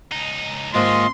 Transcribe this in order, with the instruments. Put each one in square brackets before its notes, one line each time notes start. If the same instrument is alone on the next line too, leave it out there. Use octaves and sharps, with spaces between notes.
[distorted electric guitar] C#2 D#4
[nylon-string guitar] D#2 G#2 A#3 [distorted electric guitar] D3 C#4 [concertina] F4 D#5 [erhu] C6